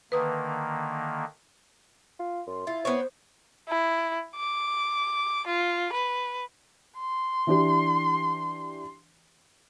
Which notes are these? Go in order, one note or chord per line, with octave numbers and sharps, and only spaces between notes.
D3 D#3 A#3 B4 D#6
F4
F#2 C6
E4 F4
B3 C4 C5 C#5
E4
D6
F4
B4
C6
E3 D4 G4